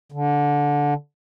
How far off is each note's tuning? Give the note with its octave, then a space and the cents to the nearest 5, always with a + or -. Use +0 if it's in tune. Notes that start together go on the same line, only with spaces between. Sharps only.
D3 -15